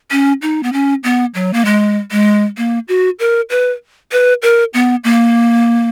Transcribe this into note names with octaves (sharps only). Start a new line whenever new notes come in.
C#4
D#4
B3
C#4
B3
F#3
A#3
G#3
G#3
A#3
F#4
A#4
B4
B4
A#4
B3
A#3